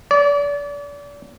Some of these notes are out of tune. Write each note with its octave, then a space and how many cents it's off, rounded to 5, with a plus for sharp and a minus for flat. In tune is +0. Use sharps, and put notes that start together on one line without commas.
D5 -35